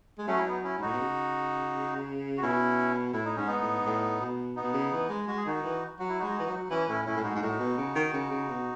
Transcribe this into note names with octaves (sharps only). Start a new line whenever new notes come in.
G#3
F#3 A3 C#4
E4
B3 D#4
C#4 E4
G#2
A2 D#4 F#4
B2
C#3
F#4
B2 C#4 E4
A2 E4
D#4
G#2 C#4
B3 D#4
A2
G#2
A2
B2
B3 D#4
B2
C#3
E3
G#3
G#3 F#4
G#4
D#3 D#4 F#4
E3
F#3 F#4
E4
G#3 D#4 F#4
E3
F#3
E3 C#4 E4
A2 C#4 E4
A2 C#4 E4
A2
G#2 D#4 F#4
G#2
A2 D#4 F#4
B2
C#3
D#3
C#3
C#3
B2